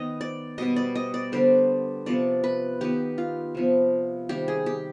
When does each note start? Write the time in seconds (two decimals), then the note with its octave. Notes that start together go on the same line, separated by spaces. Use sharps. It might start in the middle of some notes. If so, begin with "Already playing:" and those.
Already playing: D#3 B3 D#5
0.21 D5
0.58 B2 G3 B3 D#5
0.76 D5
0.95 D#5
1.14 D5
1.32 D3 G3 B3 C5
2.06 C3 F3 B3 D5
2.44 B4
2.81 D#3 B3 G4
3.18 F4
3.55 C3 F3 B3
4.29 C3 D#3 G3 G4
4.48 G#4
4.66 G4